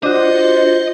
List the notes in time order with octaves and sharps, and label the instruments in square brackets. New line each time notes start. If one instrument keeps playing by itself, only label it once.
[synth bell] D4 F#4 [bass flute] F4 [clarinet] C5 [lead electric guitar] D#5